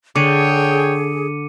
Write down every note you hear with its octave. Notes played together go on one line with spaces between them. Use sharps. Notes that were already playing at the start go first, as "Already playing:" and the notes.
D3 G#4 C#5 G5 D6 C#7 D#7